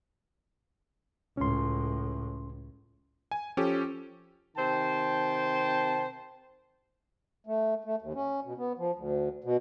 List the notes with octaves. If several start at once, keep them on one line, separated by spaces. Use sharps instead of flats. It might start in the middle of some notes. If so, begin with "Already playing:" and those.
C#2 A2 C#4 C6
G#5
F3 C#4 G4 A4
C3 D#3 C5 G5 A5
A3
A3
D#2
C#4
B2
B3
F3
D2
B2